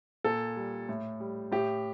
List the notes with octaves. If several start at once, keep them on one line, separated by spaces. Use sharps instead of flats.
A#2 A4
G3
A2
G3
A2 G4